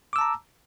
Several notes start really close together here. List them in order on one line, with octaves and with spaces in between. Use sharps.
D6 E6 A5 A#5